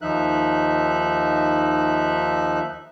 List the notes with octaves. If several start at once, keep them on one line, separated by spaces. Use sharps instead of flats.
D#2 F3 D#4 E5 F#6